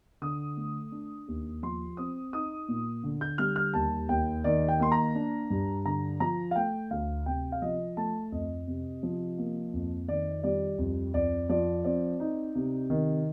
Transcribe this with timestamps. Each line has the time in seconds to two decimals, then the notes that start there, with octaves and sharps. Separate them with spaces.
0.22 D3 D#6
0.57 A3
0.92 D4
1.28 D#2
1.63 F3 C6
1.97 C4 D#6
2.33 D#4 D#6
2.68 A#2
3.03 D3
3.21 G6
3.38 G3 F6
3.56 F6
3.74 D#2 A5
4.09 D#2 G5
4.44 D#3 D5
4.68 G5
4.80 A#3 C6
4.92 A#5
5.15 D4
5.50 G2
5.85 D3 A#5
6.20 F3 A#5
6.51 F5
6.56 A3 G5
6.91 D2 F5
7.26 C3 G5
7.52 F5
7.62 F3 D#5
7.97 A3 A5
8.32 F2 D#5
8.67 C3
9.03 F3
9.38 A#3
9.73 F2
10.08 D#3 D5
10.43 G3 D5
10.78 F2
11.14 F2 D5
11.49 F3 D5
11.84 C4 D5
12.20 D#4
12.55 C3
12.90 D#3